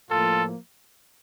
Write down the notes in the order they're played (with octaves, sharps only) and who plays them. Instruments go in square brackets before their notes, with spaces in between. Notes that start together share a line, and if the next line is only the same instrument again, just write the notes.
[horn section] A2 F3 A#3 F4 A4